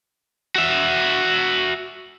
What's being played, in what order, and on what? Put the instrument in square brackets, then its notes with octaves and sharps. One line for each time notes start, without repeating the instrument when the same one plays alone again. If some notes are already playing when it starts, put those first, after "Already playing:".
[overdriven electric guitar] F#4 E5